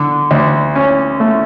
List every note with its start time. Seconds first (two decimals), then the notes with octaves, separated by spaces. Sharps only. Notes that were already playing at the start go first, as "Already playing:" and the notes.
Already playing: D3
0.31 D2
0.75 C#4
1.20 A3